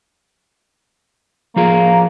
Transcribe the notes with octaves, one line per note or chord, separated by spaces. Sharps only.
F3 A#3 F4 G#4